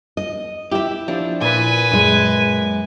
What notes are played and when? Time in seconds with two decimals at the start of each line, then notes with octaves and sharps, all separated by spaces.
0.17 D#5
0.71 E4 G4 E5
1.08 F3 D4
1.41 A#2 B4 G#5
1.91 F#2 G#3